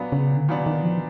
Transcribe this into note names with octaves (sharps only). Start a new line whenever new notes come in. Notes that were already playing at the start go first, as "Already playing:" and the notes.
Already playing: A#2 F#3 B3 D4
C#3
D3
A#2 D#3 F#3 B3 D4
D#3
F3